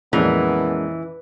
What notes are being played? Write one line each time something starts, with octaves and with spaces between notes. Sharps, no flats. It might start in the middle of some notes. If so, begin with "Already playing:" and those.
F2 A#2 E3 G#3 B3 C#4 A#4